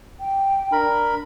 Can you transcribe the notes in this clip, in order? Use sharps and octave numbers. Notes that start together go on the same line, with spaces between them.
G5
D4 A#4 B5